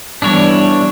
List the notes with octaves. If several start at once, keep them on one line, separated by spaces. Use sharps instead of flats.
E3 G3 B3 D4 E4 C#5